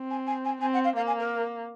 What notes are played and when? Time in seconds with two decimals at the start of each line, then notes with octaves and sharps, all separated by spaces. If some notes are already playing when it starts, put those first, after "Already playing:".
Already playing: C4
0.10 G#5
0.27 G#5
0.45 G#5
0.61 C4 G#5
0.73 F#5
0.84 F5
0.96 A#3 F5
1.07 G#5
1.19 A#4